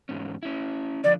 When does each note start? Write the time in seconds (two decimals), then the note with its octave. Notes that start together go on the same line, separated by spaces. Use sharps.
0.09 E2 G#2 C#4
0.43 C#4 E4
1.04 D3 F3 D4 D5